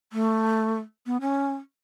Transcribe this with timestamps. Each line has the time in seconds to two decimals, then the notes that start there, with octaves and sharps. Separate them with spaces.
0.13 A3
1.06 B3
1.21 C#4